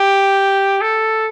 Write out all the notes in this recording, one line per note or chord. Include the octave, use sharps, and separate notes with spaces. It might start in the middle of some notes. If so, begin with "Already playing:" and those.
Already playing: G4
A4